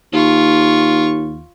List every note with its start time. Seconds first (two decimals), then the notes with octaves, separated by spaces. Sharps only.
0.13 D#2 F4 C#6